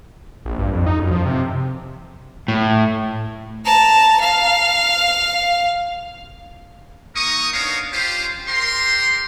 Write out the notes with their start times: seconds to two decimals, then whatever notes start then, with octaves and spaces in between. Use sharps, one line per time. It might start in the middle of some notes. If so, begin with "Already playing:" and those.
0.46 A#1
0.59 G2
0.73 F2
0.87 D#4
0.99 F#2
1.11 F3
1.26 C3
2.48 A2
3.65 A5 A#5
4.21 F5
7.16 A#3 D#4 A#4 C#6 D#6
7.53 B3 D4 D#4 A#4 C#5 F5
7.93 C#4 F4 G4 C5
8.48 G4 A#4 C5 C6